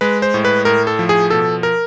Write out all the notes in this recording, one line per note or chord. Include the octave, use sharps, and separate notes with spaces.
G#3 B4
C5
A2
B4
A2 A#4
A4
F3
G#4
B2 A4
A#4